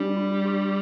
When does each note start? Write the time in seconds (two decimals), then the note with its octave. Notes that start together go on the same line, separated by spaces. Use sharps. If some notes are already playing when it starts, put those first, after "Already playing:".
Already playing: G3 D4
0.16 F4
0.46 G4